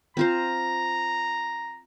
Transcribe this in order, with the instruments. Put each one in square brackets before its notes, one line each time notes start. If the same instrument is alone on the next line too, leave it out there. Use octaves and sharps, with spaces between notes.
[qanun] C4 F4 C5 [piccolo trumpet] A#5